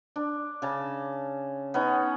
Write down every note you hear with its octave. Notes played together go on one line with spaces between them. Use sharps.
D4
C#3 A5
B3 C#4 D#4